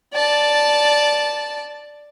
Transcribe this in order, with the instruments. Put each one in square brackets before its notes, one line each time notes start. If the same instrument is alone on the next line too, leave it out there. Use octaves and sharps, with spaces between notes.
[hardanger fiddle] D5 A5